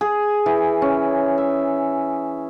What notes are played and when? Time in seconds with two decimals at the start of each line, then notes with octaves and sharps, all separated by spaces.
0.01 G#4
0.46 E3
0.82 C#4
1.38 E5